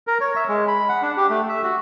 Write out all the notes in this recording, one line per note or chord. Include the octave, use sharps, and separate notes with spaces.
A#4
C#5
E5
G#3
B5
F#5
D4
G4
A3
E5
F#4